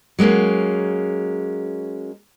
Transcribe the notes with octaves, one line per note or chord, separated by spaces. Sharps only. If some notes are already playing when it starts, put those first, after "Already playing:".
F#3 G#3 A#3 C#4